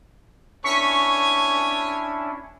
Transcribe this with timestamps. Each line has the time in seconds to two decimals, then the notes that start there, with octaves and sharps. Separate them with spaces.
0.64 C#4 D4 E4 C#5 G#5 C#6 B6